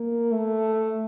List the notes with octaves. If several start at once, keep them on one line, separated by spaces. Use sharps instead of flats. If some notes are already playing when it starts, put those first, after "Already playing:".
Already playing: A#3
A3